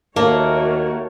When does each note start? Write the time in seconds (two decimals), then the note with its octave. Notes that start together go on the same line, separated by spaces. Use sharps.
0.16 D#2 A3 A#3 F#4 A#4 C#5